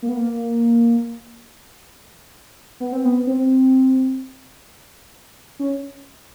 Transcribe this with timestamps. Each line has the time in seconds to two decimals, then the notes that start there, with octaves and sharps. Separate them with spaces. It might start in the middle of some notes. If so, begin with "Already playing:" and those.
0.02 A#3
0.09 B3
0.17 A#3
2.80 B3
2.93 C4
3.05 B3
3.27 C4
5.59 C#4